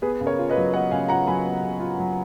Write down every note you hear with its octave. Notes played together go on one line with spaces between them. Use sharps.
B3 G#4 B4
C#3
A#4 C#5
F4
B4 D#5
F#3
B3 D#5 F#5
C#3 F5 G#5
F4 F#5 A#5
F#3 G#5 B5
B3
C#3
F4
F#3